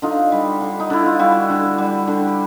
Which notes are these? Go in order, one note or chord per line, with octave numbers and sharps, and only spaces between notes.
D3 D#4 F4
G3
D3
D#4
D3 E4
F4
G3 E4 F#4
D3
G3
D3
G4